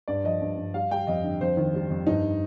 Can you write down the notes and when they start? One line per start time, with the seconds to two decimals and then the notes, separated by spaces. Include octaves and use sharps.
0.08 G2 D5
0.24 F3 D#5
0.42 G2
0.57 G2
0.74 G3 F5
0.91 G3 G5
1.07 F2 D#5
1.24 D3
1.41 F2 C5
1.57 D#3
1.74 G3
1.90 F2
2.07 G2 D#4